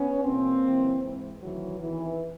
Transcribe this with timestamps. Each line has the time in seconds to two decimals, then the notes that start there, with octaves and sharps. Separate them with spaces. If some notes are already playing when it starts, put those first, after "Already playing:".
Already playing: B3 C#4
0.24 E2 B2 A#3 C4
0.64 F#2 C#3 E3
1.02 G#2 E3
1.41 D2 C3 D#3 E3 F#3
1.81 E2 C3 D#3 E3